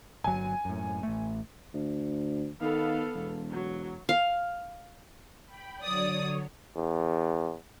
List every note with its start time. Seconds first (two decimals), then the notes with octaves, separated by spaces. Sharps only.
0.24 G1 F#3 G#5
0.65 F#2 A2
1.03 A1 A3
1.74 D2
2.61 D#3 B3 A4 F5
3.15 E1
3.51 F#3
4.09 F5
5.46 G5 B5
5.82 D3 F#3 C#5 D5 D#6
6.76 E2